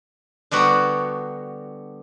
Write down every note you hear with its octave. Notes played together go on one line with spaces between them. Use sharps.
D3 G3 B3 F#4